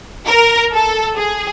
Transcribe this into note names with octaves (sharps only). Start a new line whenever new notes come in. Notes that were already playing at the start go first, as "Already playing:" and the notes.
A#4
A4
G#4